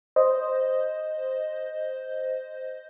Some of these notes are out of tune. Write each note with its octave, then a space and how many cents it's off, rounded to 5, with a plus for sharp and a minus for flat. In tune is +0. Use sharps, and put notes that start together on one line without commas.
C5 +0 D#5 +0